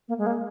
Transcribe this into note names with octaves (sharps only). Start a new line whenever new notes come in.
A#3
G#3
A#3